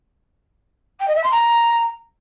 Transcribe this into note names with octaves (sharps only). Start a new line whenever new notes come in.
G5
D#5
E5
C6
A#5